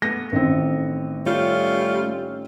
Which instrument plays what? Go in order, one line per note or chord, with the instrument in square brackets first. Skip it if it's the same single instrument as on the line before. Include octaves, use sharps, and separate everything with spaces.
[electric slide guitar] A3 B3 [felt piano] A#6
[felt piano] A1 D#3 C4
[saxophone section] G3 C#4 F4 [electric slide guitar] A3